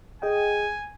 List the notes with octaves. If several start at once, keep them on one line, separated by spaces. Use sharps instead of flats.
G#4 D#5 G5 G#5